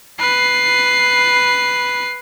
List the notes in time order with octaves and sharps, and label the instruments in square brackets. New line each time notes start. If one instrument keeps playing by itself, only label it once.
[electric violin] B4 C7